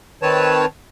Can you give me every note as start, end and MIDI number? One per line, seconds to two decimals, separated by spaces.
0.22 0.66 51
0.22 0.66 60
0.22 0.66 71
0.22 0.66 73
0.22 0.66 81